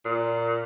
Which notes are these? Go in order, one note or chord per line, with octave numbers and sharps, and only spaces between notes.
A#2